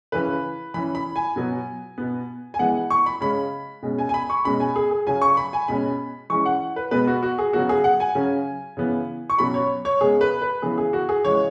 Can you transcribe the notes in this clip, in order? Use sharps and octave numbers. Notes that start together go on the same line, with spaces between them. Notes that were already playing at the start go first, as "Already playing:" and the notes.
C#3 E3 C#4 B4
E3 C#4 B5
B5
G#5
B2 F#3 B3
B2 B3
G#5
E3 G#3 B3 F#5
C#6
B5
C#3 G#3 C#4 B5
B2 G#3 C#4
G#5
G#5
B5
C#6
B2 G#3 C#4 B5
G#5
G#4
G#4
C#3 F#3 C#4 G#5
C#6
B5
G#5
B2 G#3 C#4 B5
E3 G#3 C#4 C#6
F#5
B4
B2 G#3 B3 B4
F#4
F#4
G#4
C#3 F#3 B3 F#4
G#4
F#5
G#5
C#3 F#3 C#4
C#3 E3 B3
C#6
B2 F#3 C#4 B5
C#5
C#5
C#3 G#3 B3 G#4
B4
B4
C#3 E3 B3 G#4
G#4
F#4
G#4
C#3 E3 G#3 C#5